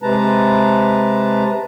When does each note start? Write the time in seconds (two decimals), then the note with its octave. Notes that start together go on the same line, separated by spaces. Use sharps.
0.02 C3 G#3 B4 A5 A#5